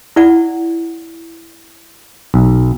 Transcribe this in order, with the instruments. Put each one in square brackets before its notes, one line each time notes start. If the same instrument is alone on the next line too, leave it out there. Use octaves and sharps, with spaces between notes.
[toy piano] E4 D5 F#5
[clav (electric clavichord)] B1